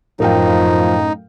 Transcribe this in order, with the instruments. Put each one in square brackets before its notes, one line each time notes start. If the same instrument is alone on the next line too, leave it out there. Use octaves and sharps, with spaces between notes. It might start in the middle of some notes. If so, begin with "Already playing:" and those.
[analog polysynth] F#2 A2 [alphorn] F3 [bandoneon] D#4 [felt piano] A#4 F5 G5